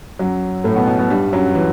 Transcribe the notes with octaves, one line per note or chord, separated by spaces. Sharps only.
F#2 F#3
A2 A3
B2 B3
B2 B3
B2 B3
G2 G3
F#2 F#3
E3